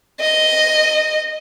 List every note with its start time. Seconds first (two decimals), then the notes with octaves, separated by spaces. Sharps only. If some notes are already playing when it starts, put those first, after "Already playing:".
0.20 D#5